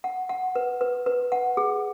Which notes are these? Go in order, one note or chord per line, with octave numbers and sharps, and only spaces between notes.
F#5
F#5
B4
B4
B4
F#5
G#4